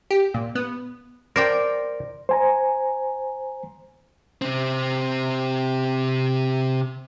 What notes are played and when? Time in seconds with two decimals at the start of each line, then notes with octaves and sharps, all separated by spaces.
0.11 G4
0.34 A#2
0.55 B3
1.36 A#4 C5 D5 G5
2.29 C5 G#5 A#5
4.42 C3 C4